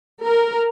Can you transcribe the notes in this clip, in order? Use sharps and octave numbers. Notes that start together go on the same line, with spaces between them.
A#4